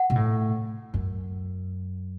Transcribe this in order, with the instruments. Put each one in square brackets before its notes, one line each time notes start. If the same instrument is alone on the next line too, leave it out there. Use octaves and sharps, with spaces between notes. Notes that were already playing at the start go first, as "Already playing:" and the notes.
Already playing: [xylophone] F#5
[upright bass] B2
A2
F#2